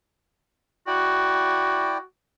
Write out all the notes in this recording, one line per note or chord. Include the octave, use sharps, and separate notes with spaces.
E4 F#4 D5 G5